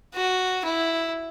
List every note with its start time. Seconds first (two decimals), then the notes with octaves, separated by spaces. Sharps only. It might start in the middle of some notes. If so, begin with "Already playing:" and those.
0.15 F#4
0.65 E4